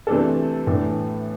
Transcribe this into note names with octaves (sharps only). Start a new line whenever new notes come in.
C3 E3 A3 D4 A4
A2 E3 A3 D4